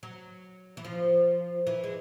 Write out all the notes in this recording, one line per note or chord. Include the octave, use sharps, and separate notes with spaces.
F#3
E3
F3
E3
G#3